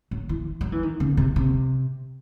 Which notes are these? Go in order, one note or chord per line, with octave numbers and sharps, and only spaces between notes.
F#3
E3
F#3
E3
D#3
C#3
C3
C3